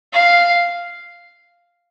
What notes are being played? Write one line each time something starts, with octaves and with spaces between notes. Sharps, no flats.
F5